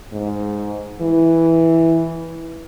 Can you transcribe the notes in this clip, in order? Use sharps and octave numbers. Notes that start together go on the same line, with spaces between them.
G#2
E3